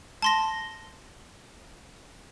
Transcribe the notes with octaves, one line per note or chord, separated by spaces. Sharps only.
A5 C6 A#6